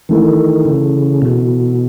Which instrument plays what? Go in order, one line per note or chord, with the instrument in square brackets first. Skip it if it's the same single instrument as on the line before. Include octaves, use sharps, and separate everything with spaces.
[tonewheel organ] D#3 [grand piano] E3 A3 E4
[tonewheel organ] C#3
B2